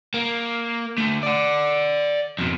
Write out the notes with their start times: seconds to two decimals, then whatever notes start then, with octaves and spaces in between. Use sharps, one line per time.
0.14 A#3
0.98 D3 A3
1.23 D5 F#5
2.39 F2 B2